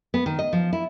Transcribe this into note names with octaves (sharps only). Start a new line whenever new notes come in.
B3
D#3
D#5
F3
E4